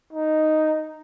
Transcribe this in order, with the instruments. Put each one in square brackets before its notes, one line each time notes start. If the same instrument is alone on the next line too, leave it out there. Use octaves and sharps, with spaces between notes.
[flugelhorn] D#4